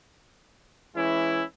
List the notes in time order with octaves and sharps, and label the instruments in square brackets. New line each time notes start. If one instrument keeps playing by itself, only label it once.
[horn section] E3 G#3 C#4 E4